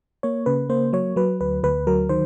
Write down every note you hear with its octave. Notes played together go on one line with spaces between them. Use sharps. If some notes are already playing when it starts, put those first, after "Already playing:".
A#3 C#5
C#3 B4
A#3 C5
F#3 C#5
F#3 B4
D2 B4
D2 B4
F#3 A#4
D#3 C5